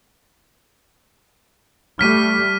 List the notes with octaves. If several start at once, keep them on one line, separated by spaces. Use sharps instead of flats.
G3 A3 F6 B6 D#7